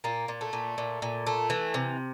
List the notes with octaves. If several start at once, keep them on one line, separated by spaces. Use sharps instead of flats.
A#2 A#3
A#2
A3
A#2
A#2
A#2
A3
E3
C3